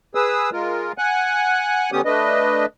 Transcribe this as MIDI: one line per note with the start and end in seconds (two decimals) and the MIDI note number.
0.15 0.50 68
0.15 0.50 71
0.15 0.50 87
0.15 0.50 88
0.53 0.92 56
0.53 0.92 65
0.53 0.92 70
0.98 1.90 78
0.98 1.90 80
0.98 1.90 90
1.92 2.01 50
1.92 2.01 59
1.92 2.01 61
1.92 2.01 67
1.92 2.01 87
2.05 2.66 57
2.05 2.66 62
2.05 2.66 71
2.05 2.66 75